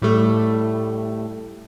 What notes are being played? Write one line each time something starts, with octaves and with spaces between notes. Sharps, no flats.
A2 G3 A3